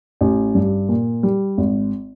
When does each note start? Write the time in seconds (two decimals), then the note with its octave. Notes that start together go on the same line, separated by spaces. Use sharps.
0.21 A1
0.55 G2
0.89 A#2
1.23 G3
1.58 G#1